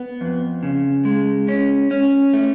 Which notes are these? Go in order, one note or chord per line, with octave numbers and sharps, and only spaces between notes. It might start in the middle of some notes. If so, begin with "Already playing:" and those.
Already playing: B3
F2
C#3
G#3
C#4
C#4
A3